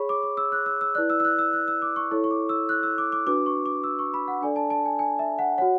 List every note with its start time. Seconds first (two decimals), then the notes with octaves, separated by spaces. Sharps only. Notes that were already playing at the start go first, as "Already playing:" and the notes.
Already playing: G#4 C#5 B5 C#6
0.09 D6
0.23 D6
0.37 E6
0.52 F#6
0.66 E6
0.81 E6
0.95 E4 B4 D5 F#6
1.10 E6
1.20 E6
1.25 F#6
1.39 E6
1.53 F#6
1.68 E6
1.82 D6
1.96 C#6
2.11 E4 A4 C#5 C#6
2.24 C#6
2.31 D6
2.49 E6
2.69 F#6
2.83 E6
2.98 D6
3.12 D6
3.26 D4 F#4 B4 D6
3.46 C#6
3.66 D6
3.84 E6
3.99 C#6
4.14 B5
4.28 F#5
4.41 D4 A4 D5 G#5
4.56 A5
4.70 A5
4.85 G#5
4.99 G#5
5.19 E5
5.39 F#5
5.58 F#4 C#5 F#5